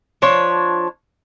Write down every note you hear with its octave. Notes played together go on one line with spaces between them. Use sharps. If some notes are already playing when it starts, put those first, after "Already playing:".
F3 D4 C#5